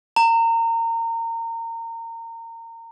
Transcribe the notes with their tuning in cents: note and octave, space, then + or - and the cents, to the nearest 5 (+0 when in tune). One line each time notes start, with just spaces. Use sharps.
A#5 -30